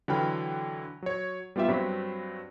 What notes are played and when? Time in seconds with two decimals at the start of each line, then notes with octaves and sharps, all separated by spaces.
0.08 D3 E3 F#3 G5 B5 F6
1.02 F#3 C#5
1.56 G3 B3 F4 G4 E5
1.68 G2 F#3 C4 B6